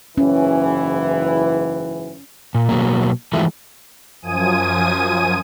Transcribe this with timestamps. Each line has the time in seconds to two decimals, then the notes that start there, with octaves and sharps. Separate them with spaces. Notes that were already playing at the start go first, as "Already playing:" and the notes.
0.18 F#1 G#2 E3 C#4
2.55 A#2
2.69 B2 F#3 A#3
3.33 E3 F3 G#3 A3 E4 F#4
4.22 F#2 F3 G#5 D#6 D#7